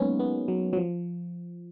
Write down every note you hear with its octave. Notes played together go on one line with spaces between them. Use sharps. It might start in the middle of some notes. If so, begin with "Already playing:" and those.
Already playing: F#3 G#3 A#3 B3 C#4 D#4
B3
F#3
F#3
F3